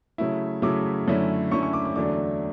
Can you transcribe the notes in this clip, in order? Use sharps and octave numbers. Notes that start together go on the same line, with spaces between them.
C#3 F#3 A3 E4
C#3 F#3 A3 E4 D6
F#2 D3 A3 C#4 E4
F#2 D3 A3 C#4 E4 C#6
C#6
D6
D6
E2 D3 F#3 A3 D4 D6